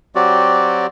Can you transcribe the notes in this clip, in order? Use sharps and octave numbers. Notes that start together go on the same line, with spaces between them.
F#3 C4 F#4 G4 D5